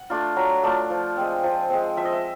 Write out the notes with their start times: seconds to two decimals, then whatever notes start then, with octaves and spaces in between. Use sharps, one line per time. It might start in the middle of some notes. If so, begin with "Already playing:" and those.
Already playing: F#5
0.10 A3 D4 F4
0.36 F#3
0.63 A3 D4 F4
0.90 F3
1.17 G#3 C4
1.43 F3
1.70 G#3 C4
1.97 F3 E5
2.05 D#5
2.12 E5